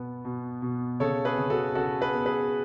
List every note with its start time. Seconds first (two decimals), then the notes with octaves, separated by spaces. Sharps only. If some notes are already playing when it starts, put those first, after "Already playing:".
Already playing: B2 B3
0.25 B2
0.62 B2
1.00 C#3 A4 C#5
1.25 G#4 B4
1.38 C#3
1.50 F#4 A4
1.75 C#3 F#4 A4
2.00 G#4 B4
2.14 B3
2.26 G#4 B4